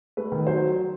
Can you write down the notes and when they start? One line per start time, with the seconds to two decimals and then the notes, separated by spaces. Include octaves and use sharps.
0.17 A3 B4
0.32 D#3
0.47 F#3 C5